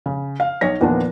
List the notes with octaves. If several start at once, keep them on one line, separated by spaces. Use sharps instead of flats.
C#3
F5
B1 C#5 A#6
E2 A#2 D#3 F3 B3 D4